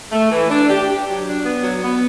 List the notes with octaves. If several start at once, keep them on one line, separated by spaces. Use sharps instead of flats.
A3
E3
D4
G4
G4
F#3
D4
B3
F#3
B3